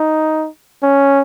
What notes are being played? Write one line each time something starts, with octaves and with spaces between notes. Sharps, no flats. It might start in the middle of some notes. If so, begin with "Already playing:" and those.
Already playing: D#4
C#4